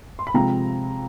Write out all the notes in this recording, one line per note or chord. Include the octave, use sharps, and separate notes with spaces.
C6
B5
C3 F3 G#3 C4 A#5